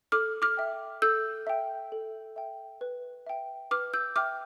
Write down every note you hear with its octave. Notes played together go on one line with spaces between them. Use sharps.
A4 D6 F6
D6 F6
E5 G5
A4 E6 G6
E5 G5
A4
E5 G5
B4
E5 G5
B4 D6 F6
E6 G6
E5 G5 D6 F6